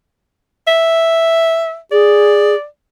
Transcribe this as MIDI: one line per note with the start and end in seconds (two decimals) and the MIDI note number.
0.67 1.79 76
1.92 2.55 68
1.92 2.66 74